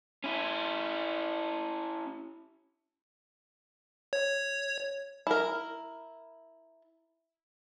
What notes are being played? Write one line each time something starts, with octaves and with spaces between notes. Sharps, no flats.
C#4 E4
C#5
E4 A#4